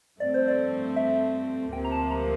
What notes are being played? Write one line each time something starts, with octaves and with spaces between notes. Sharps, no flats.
G2 F3 A3 C4 D5
C5
D5
E5
D2 C3 F3 A#3 G5
A#5
A5
A#5